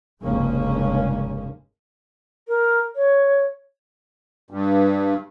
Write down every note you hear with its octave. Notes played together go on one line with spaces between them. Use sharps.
F1 C#2 G2 G#3 A#3 C#4
A#4
C#5
G2